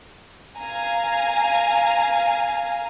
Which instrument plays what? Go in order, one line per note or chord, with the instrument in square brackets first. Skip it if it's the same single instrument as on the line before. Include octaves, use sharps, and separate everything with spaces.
[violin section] F5 G#5 A#5